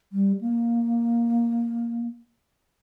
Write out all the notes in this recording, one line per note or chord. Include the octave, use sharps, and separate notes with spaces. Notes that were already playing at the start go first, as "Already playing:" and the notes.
G3
A#3